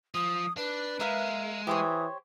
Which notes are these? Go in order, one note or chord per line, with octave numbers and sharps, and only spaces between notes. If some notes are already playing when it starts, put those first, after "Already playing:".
F3 D#6
D4 B4
G#3 A#4 E5 F5
E3 G4 C5 C#5 D#6